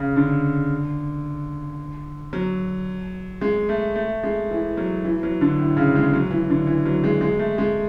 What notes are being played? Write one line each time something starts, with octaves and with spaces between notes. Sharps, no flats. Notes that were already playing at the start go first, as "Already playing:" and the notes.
Already playing: C#3
D3
F#3
G#3
A3
A3
G#3
E3
F#3
E3
F#3
D3
A2
C#3
G#3
F#3
E3
D3
E3
F#3
G#3
G#3
A3
G#3